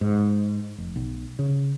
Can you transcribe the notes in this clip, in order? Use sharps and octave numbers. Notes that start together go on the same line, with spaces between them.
G#2
F1
B1
C#3